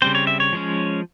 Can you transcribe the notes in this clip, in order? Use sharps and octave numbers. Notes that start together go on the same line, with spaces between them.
C#3 G3 C4 C5
C#5
E5
C#5
F3 G#3 C#4